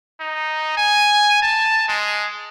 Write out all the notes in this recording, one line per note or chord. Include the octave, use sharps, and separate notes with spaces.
D#4
G#5
A5
G#3